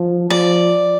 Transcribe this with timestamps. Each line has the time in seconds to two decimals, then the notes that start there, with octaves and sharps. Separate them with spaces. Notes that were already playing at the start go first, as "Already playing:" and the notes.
Already playing: F3
0.30 F3 D5